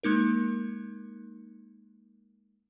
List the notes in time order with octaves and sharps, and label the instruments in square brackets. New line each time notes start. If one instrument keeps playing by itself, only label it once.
[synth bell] G#3 A#3 D#4 A#4